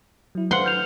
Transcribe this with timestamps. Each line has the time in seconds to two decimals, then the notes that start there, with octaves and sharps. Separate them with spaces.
0.35 F#3 E4
0.51 B4 C5 F5 F#5 C6
0.64 F6 G6 F7